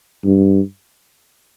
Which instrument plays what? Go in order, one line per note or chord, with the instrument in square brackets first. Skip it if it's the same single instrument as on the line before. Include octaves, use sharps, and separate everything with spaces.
[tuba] G2